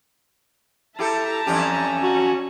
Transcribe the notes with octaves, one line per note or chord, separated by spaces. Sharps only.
E4 G4 A4 E5 A5 A#5
E2 G2 C#4 G4
F#4